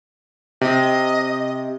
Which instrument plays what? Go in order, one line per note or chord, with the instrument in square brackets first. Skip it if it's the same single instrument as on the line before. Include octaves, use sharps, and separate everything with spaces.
[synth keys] C3 [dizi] D#5